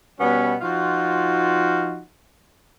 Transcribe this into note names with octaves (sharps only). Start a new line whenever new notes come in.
B2 G3 B3 C#4
F3 D#4 F4 F#4